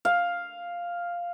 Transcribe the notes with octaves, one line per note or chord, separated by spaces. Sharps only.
F5